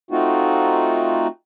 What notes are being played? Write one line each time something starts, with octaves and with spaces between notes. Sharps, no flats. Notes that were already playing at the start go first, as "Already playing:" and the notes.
A3 C4 D#4 F4 F#4